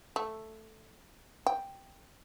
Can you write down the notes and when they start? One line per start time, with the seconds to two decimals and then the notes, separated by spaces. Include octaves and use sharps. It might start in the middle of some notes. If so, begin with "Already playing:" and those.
0.16 A3
1.46 G5